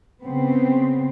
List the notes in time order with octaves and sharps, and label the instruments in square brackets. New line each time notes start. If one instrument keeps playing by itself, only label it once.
[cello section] C#3 B3 C4